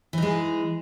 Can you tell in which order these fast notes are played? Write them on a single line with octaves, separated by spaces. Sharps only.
E3 D#4 G#3